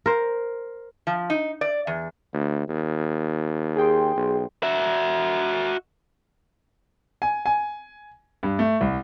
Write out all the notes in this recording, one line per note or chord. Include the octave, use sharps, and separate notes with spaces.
A#4 C5
F3
D#4
D5
E2
D2
D#2
G#4 G5 C6
B1
F#4 E5
G#5
G#5
G2
A3
C2